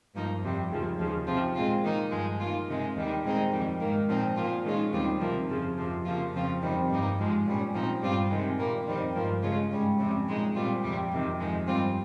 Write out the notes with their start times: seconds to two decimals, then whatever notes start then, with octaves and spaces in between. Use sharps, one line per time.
0.14 G2 F3 A#3 D#4
0.42 F2 C3 G3
0.70 D#2 C#3 F3
0.99 D#2 C#3 F3
1.27 C3 F3 C4 F4
1.55 A#2 G#3 C4 F4
1.83 D#3 A#3 D#4
2.11 G2 F3 G#3
2.39 D#3 A#3 F4
2.68 C3 D#3 G#3
2.96 D#2 D#3 G3
3.24 A#2 G#3 C4 D#4
3.52 F2 D#3 G3
3.81 G#2 D#3 A#3
4.08 A#2 F3 C4 D#4
4.37 A#2 F3 A#3 F4
4.64 D#3 G#3 C#4 F4
4.93 D#2 D#3 G3 C4 F4
5.20 C3 F3 A#3
5.49 F2 C#3 F3
5.78 F2 C3 F3
6.05 C#3 F3 A#3 F4
6.33 F2 C#3 F3 C4 F4
6.61 F2 C3 D#3 G3 C4
6.89 G2 G3 A#3 D#4
7.18 G#2 F3 G#3
7.46 A#2 G3 C#4
7.74 A#2 F3 C4 D#4
8.02 G2 G3 C4 F4
8.30 C3 D#3 G#3
8.58 A#2 G3 A#3
8.87 F2 D#3 G3 C4
9.14 G2 F3 A#3
9.43 C#3 G#3 C#4 F4
9.71 G#2 G3 C#4
9.99 F2 C3 G3 C#4
10.27 A#2 G#3 D#4
10.55 A#2 G3 C4 F4
10.84 F2 C3 G3
11.11 F2 C3 D#3
11.40 F2 D#3 G#3
11.68 G2 G3 C4 F4